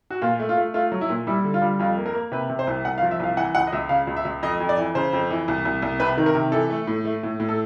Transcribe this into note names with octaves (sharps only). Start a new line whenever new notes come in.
F#4
A#2 F4
A3
F4
A3
A3 F4
F#3
E4
A#2
G3 E4
D3
F4
G3
F2 F4
A#3
A#4
A#3
C3 B4
C3
C5
C2
C2 F#5
F5
F3
E5
C2 F5
E3 F#5
C#2 F#5
D#5
C#2 E5
C#3 F5
C#2
E5
C#2
F2 D#5
F2
D5
E3
C#3 C5
F2
E3
C2
C2
C2
C3 B4
D#3
A#4
C3
E3 A4
A3
A2
A3
A2
A2
A4